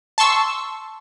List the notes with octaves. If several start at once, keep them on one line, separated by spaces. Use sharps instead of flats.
A5 C6 C#6 E6